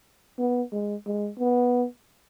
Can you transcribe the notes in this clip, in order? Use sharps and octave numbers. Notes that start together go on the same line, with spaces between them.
B3
G#3
G#3
B3